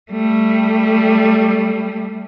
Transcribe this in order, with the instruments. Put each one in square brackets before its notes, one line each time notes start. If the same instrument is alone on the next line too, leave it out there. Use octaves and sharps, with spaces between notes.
[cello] G3 A3